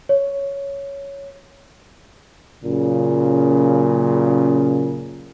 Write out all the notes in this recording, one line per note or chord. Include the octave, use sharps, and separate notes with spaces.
C#5
F#2 A#2 C#3